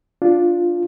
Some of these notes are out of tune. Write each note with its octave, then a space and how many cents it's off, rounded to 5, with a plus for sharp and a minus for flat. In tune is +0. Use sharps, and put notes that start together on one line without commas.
D4 +0 F4 +0